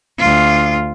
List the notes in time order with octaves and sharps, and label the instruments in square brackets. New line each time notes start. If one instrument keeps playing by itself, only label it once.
[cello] D2 F4